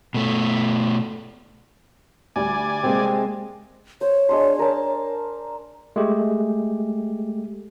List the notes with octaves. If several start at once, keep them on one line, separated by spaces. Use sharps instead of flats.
B2 A3
D2 G3 D5 G#5
C3 G3 G#3 A#3 C4
C5 C#5
G#3 D4 C6
A#4 A5
G#3 A3 G4